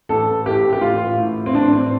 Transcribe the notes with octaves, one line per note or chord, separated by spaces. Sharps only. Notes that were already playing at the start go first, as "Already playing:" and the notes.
A1 A4
A2 G4
G4
A1 F4
A2
C4
A1 D4
C4